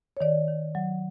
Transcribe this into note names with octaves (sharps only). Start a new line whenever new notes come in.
C#5
D#3 D5
D#3
F#3